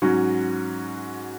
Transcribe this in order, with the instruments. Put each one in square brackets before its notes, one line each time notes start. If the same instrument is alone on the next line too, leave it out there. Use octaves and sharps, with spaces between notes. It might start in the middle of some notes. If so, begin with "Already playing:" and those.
[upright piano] G#2 F#3 C#4 F#4